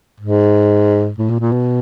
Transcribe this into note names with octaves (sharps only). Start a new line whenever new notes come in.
G#2
A2
A#2
A#2
B2